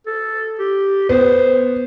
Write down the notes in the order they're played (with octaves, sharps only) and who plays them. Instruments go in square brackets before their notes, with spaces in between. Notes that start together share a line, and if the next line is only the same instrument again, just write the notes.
[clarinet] A4
G4
[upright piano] B3 [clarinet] C5